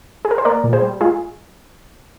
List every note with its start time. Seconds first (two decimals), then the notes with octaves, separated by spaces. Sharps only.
0.25 G#4
0.31 A#4
0.38 C5
0.45 A#3 A#4 D5
0.64 A#2
0.73 G#4 C5
0.82 G3
1.01 G#3 F4 G#4